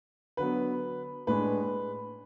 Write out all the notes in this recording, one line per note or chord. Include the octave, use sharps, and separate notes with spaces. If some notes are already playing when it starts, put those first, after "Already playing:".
D3 F#3 B3 B4
A2 G#3 D4 B4